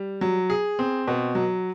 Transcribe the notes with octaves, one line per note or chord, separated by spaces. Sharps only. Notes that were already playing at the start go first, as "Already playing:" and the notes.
Already playing: G3
F#3
G#4
C4
B2
F#3